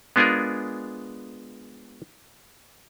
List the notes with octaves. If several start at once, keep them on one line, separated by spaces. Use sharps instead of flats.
G#3 B3 D4 F4 G#4 A#4